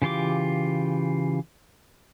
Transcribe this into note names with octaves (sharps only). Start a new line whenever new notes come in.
C#3 E3 F4 G4 D6